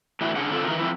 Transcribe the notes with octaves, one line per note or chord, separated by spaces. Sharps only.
A2 E3 D4 E4 F#4
C#3 D4 G#4 F#5
D3 C4 F4 A4
D#3 E3 A#4
F3 C4 E4